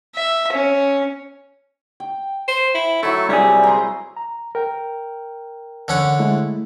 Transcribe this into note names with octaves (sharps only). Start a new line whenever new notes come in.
E5
C#4
G5
C5
E4
F#3 A3 E4
C2 G3 G#4
A#5 C6
A#5
A#4 G5
D3 C#4 F#5
G#3 A3 E4